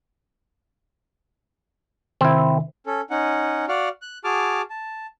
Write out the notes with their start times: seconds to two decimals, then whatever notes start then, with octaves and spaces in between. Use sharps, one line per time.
2.21 C3 D#3 C4 E4
2.86 C#4 A4
3.10 C#4 D#4 F#5
3.68 F#4 D5 F5 F#5
4.02 F#6
4.24 F#4 G#4 A5 D6 F6
4.70 A5